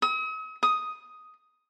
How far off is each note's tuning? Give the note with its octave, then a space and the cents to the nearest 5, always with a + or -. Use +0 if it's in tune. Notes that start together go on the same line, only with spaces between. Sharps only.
D#6 +45
D#6 +5